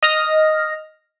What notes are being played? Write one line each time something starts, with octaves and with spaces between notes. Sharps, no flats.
D#5 F6 A#6